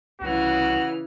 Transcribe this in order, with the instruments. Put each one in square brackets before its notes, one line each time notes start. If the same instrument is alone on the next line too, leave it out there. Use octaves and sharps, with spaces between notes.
[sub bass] C2 [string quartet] C#3 E3 F6 [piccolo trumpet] F#4